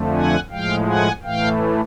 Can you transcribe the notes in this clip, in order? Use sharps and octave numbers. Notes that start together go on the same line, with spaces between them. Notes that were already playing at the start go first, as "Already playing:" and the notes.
Already playing: F2 D3 F3 A3
F#5 G#5
A2 F3 G#3 F5 G5
F#5 G#5
A2 E3 A3 F5 G5